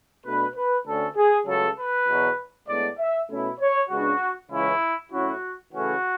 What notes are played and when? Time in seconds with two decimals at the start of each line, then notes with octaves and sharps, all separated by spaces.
0.25 B2 A3 D4 B4
0.55 B4
0.86 D2 D3 A3 C#4 A4
1.16 G#4
1.46 C#2 C#3 F#3 A3 A4
1.78 B4
2.08 E2 B2 F#3
2.68 A2 G#3 B3 D4 D5
2.99 E5
3.30 B2 A3 C#4 E4
3.60 C#5
3.90 C#2 C#3 G#3 B3 D4 F#4
4.51 C#2 C#3 E3 G#3 C#4 E4
5.11 A2 F#3 C#4 E4 F#4
5.72 C#3 E3 A3 C#4 E4 F#4